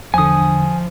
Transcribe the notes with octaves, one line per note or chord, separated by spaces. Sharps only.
E2 D3 F3 G#5 D#6